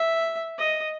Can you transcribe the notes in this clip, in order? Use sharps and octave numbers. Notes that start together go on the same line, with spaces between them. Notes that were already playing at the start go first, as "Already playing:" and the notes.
Already playing: E5
D#5